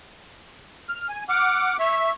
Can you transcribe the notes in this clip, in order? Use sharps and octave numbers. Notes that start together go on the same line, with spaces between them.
F6
G#5
F#5 D6 F6
E5 C#6